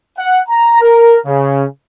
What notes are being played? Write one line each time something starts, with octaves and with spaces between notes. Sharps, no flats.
F#5
A#5
A#4
C#3